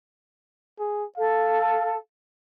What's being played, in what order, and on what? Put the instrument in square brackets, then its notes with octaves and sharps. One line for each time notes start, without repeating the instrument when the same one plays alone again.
[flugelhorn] G#4
[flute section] A4 [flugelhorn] F5